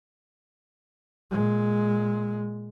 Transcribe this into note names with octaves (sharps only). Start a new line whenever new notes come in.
A#2 G#3